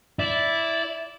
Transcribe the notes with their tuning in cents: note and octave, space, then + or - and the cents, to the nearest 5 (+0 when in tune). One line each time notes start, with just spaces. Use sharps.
E4 +0 D5 -10